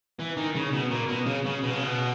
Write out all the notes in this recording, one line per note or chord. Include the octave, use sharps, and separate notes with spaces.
E3
D#3
C#3
B2
A#2
B2
C#3
C#3
B2
C#3
B2